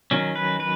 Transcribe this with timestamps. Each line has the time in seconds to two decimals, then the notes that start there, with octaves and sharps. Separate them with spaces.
0.11 D#3 F#3 C#4
0.36 B4
0.60 B4